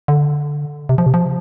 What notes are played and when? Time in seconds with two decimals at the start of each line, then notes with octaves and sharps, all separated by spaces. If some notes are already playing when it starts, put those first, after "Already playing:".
0.08 D3
0.89 C3
0.98 F3
1.06 C3
1.14 F3